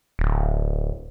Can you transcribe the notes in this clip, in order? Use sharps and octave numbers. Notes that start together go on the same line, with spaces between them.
D1